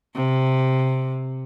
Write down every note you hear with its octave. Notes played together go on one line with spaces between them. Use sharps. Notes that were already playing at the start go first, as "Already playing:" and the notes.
C3